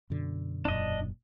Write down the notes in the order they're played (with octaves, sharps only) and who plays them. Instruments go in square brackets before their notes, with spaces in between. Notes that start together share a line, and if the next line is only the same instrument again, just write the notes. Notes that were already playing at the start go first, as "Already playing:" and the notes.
[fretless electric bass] F#2 B2 D3
[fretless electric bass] E1 F#2 A#2 [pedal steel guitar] D4 D#5